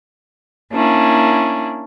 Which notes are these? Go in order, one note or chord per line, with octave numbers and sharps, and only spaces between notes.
A#3 C#4 D4 E4